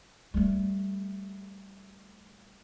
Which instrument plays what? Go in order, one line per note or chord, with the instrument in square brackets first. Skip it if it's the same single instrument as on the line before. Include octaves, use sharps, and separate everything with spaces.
[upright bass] G3 A3